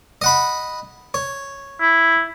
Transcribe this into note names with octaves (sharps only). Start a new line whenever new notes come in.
D#5 F#5 B5
C#5
E4